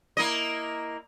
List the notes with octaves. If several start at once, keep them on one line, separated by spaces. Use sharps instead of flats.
A#3 E4 D#5